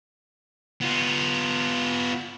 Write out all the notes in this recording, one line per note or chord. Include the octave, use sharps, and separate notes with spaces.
B3 F4